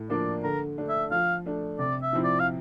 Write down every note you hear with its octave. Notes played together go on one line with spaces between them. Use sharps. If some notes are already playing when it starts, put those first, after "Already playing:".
Already playing: A2
F3 A#3 D4 D5
D3 A#4
A3 D4
E5
F3 F5
A3 D4
C3 D5
E5
F3 C4 E4
D5
F5